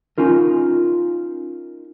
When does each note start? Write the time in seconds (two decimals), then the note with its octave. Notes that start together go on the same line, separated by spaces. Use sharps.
0.18 C#4 D#4 F4 A#4